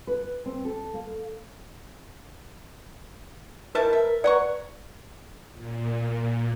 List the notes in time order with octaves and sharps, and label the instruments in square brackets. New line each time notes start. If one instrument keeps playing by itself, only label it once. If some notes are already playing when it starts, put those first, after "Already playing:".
[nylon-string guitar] B4
C4
A4
A#3
[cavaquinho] D#4 E4 A5 [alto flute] A#4 [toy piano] B4
[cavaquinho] E5
[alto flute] B4 [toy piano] D5 [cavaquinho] F#5 A#5 C#6
[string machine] A#2